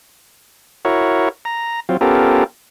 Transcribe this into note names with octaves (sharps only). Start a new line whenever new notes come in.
E4 F#4 A#4 C#5
A#5
F#3 C4 F4
B3 C#4 F4 G4 A4 A#4